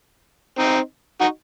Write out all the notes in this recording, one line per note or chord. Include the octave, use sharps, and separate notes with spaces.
C4 D#4
D#4 F#4